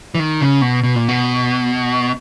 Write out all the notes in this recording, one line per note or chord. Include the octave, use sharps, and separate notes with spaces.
E3
D#3
C#3
B2
B2
A#2
B2